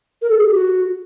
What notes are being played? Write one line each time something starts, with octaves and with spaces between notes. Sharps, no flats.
A#4
A4
G#4
G4
F#4